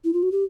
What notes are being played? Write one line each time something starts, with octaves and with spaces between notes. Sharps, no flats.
E4
F4
F#4
G4